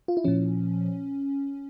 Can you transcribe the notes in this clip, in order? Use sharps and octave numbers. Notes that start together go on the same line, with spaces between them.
F4
E4
A#2 F3 C#4